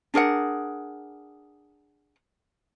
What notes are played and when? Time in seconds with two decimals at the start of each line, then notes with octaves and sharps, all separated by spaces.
0.14 D4 G#4 A#4 F#5